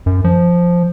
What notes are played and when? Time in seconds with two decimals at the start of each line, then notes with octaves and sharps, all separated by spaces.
0.06 F#2
0.24 F3